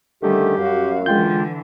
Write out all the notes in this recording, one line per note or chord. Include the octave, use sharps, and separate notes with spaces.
D3 D#3 G3 A3 C#4 G4
F#2 F#4 F5
D3 E3 G#3 F4 G5 G6